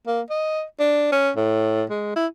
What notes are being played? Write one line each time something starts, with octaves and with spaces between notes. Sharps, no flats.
A#3
D#5
D4
C#4
A2
G#3
E4